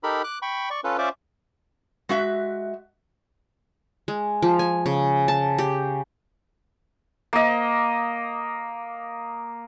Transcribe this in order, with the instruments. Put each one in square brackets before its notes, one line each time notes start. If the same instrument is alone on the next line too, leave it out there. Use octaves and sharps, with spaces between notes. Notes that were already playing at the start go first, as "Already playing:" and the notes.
[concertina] D#4 G4 A4 A#4 B5
D6 F#6
G5 B5 C#6
D5 C#6
C#4 F4 A4 B4
C#4 F4 C5 D5 E5 D6
[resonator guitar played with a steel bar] G#3 F#4 E5
[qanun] G#3
F3
G#5
C#3
A5
G4
[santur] A#3 D#5